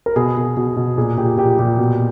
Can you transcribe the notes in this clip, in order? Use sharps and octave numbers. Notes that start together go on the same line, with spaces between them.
A#4
B2 G#4
B2
B2
B2
A#2 G#4
A#2 G4
A#2 G4
A#2 G4
B2